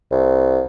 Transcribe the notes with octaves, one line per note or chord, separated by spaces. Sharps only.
C2